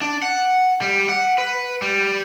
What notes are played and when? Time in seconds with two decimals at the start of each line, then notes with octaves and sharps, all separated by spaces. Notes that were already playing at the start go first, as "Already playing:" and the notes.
0.01 D4
0.22 F#5
0.82 G3
1.09 F#5
1.38 B4
1.82 G3